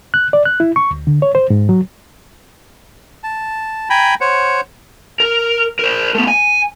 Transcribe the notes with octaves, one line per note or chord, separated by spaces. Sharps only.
F#6
D5
F#6
E4
C#6
D2
D3
C#5
C5
G#2
F#3
A5
G5 G#5 A#5 B5
C5 C#5 F#5
A#4
A#4 C5
A3 B3
G#5